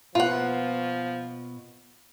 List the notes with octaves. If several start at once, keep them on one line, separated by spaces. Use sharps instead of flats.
B2 F3 A#3 B3 F4 F#5